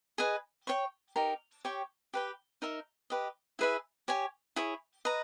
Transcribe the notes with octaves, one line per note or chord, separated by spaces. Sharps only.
G#4 B4 D#5 G#5
C#5 G5 C#6
D#4 G4 A#4
G4 C#5 G5 C#6
G4 B4 G5
D#4 A#4 E5
G4 B4 D#5
E4 G#4 B4 E5
G4 C#5 G#5
E4 G#4 C#5
B4 D#5 A#5